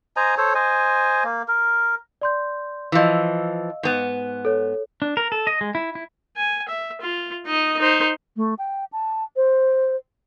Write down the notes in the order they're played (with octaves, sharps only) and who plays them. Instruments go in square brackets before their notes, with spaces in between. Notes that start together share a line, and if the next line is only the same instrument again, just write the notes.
[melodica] C5 D#5 G#5 A#5
A4 C5 C#5
C5 D#5 G#5
A#3
A#4
[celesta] D5 C6 G6
[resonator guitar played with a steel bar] E3 F3 [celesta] D#5 F5 E6
[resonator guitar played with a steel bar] G#2 B3
[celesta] A4 C#5
[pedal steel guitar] D4
A#4
A4
D#5
G#3
E4
E4
[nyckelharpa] G#5
E5
F4
D#4 D#5
D#4 C5
[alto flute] A3
G5
A5
C5